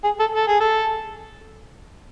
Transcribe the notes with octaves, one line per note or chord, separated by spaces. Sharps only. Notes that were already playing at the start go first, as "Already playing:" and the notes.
G#4
A4
A4
G#4
A4